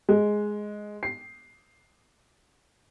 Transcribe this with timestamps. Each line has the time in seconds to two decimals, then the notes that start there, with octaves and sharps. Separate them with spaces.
0.09 G#3
1.03 C7